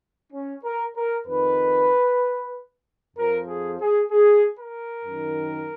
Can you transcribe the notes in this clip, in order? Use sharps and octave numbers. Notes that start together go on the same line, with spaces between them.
C#4
A#4
A#4
F2 D#3 B4
F2 F3 A#4
G#4
G#4
G#4
A#4
F#2 D#3